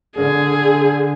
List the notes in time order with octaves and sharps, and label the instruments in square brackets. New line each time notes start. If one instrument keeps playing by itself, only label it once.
[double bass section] D3 [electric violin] G#4